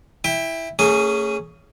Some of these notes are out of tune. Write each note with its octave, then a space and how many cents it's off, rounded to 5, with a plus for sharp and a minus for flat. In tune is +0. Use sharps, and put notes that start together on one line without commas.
E4 +0 G5 +20
A3 +45 C#4 +0 G#4 +0